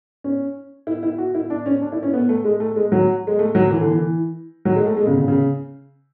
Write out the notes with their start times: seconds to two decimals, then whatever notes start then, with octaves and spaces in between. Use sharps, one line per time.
0.24 C#4
0.87 E4
1.03 E4
1.18 F#4
1.35 E4
1.50 D4
1.66 C#4
1.82 D4
1.92 E4
2.03 C#4
2.13 B3
2.29 A3
2.44 G#3
2.60 A3
2.76 G#3
2.92 F#3
3.27 G#3
3.39 A3
3.55 F#3
3.71 E3
3.81 D3
3.91 E3
4.65 F#3
4.76 G#3
4.86 A3
4.97 G#3
5.07 C#3
5.17 C#3
5.28 C#3